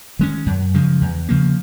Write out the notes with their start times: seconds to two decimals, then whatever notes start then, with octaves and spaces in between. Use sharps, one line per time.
0.19 D#3 G#3 C#4
0.46 F#2
0.74 C#3 F3 G#3
1.01 E2
1.29 C#3 F3 A#3